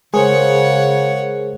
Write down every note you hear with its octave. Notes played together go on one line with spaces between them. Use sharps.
C#3 G#3 G#4 A#4 C5 C#5 F#5